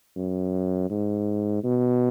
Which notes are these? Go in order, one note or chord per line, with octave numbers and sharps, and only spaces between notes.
F#2
G#2
B2